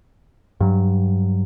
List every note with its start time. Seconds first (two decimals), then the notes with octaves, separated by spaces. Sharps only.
0.60 G2 F#3